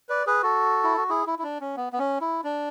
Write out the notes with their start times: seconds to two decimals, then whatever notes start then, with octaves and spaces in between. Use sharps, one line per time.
0.09 B4 D5
0.27 G#4 B4
0.42 F#4 A4
0.83 E4
0.97 F#4
1.09 E4 G#4
1.27 E4
1.39 E4
1.43 D4
1.61 C#4
1.77 B3
1.93 B3
1.98 C#4
2.21 E4
2.44 D4